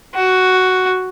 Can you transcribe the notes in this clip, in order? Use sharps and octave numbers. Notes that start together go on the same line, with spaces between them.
F#4